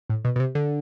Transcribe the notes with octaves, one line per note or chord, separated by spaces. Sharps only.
A2
B2
B2
C3
D3